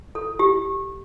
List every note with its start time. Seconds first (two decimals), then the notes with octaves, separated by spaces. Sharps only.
0.15 A4
0.39 G4